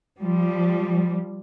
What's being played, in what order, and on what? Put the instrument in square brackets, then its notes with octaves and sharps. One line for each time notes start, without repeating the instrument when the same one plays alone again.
[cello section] F3 G3